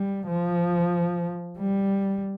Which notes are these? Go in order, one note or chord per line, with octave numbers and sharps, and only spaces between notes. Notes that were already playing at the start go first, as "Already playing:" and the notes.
Already playing: G3
F3
G3